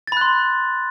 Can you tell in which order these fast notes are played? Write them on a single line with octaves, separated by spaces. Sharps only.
A6 B5 F#6 C6